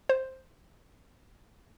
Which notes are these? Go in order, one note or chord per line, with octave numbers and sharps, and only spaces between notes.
C5